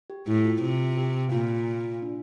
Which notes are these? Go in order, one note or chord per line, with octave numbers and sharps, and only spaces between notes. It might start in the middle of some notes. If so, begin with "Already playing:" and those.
G4
A2 E4
F4
C3
G4
A#2 F4
D4